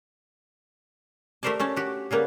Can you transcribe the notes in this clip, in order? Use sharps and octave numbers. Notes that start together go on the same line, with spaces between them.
A3 G4 A#4 C5 D5 A5
A3 C#4 A5
F#4 G4
C#3 G3 A#3 B3